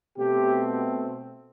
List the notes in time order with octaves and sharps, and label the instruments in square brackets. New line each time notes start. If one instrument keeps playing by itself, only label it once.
[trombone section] B2 A3 C4 G4